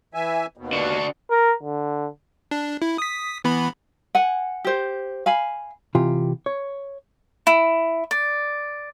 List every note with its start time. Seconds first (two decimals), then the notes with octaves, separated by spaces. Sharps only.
0.14 E3 E5 G#5
0.57 D#2 B2
0.73 D3 D4 F#4
1.30 A#4
1.63 D3
2.51 D4
2.82 E4
2.98 D#6 B6
3.44 E3 B3 B5
4.15 F#5 G#5
4.65 G4 C5
5.26 F5 G#5 B5
5.95 C3 E3 F4 G4
6.46 C#5
7.47 E4
8.11 D5